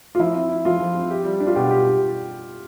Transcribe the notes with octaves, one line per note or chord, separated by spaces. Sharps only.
F4
F3 E4
C4
E4
F3 F4
F3
C4
G4
G3
D4
F4
B2 G4
G4